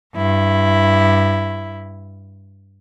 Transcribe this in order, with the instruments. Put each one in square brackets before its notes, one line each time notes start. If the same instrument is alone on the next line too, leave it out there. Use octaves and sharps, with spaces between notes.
[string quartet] G2 E4